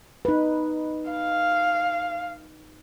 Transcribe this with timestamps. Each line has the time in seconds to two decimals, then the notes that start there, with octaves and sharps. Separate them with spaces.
0.25 D#4 B4
1.11 F5